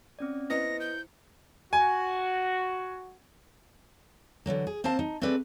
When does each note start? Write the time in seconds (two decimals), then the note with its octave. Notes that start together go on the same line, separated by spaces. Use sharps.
0.19 C4 C#4 D5
0.50 B3 E4 C5 D#5 A#6 C#7
0.80 G6
1.73 F#4 G#5
4.46 D3 E3 F#3 A#3
4.67 G#4
4.84 A#3 C4 C5 F5 A5
4.99 D#4
5.22 A3 C4 D4 G#4 B4 D5